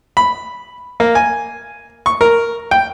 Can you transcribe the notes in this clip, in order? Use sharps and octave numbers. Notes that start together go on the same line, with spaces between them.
B5
A#3
G#5
C#6
A#4
G5